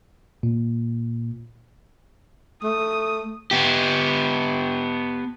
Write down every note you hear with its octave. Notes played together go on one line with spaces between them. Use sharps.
A#2
A3 D#6
B3 G4